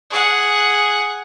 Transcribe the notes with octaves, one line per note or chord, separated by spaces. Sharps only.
G#4 F#5